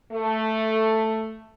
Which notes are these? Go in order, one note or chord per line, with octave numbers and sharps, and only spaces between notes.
A3